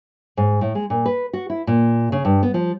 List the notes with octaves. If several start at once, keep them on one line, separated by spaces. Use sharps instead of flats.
G#2
A2
G#3
A#2
B4
F#4
E4
A#2
C#3
G2
B3
F3